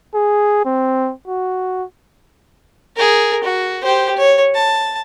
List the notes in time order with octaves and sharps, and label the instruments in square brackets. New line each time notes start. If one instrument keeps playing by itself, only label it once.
[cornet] G#4
C4
F#4
[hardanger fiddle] G#4 A#4
F#4
G4 C5
C#5
A5